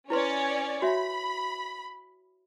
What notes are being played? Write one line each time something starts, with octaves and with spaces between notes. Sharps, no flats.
C#4 E4 B4 C#5 D5 C6
F#4 C#5 E5 B5